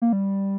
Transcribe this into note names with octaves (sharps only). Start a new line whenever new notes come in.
A#3
G3